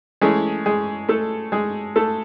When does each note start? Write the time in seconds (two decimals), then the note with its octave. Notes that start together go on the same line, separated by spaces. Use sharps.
0.21 E3 G#3 A3 C#4 G#4
0.66 G#3 G#4
1.09 A3 A4
1.52 G#3 G#4
1.96 A3 A4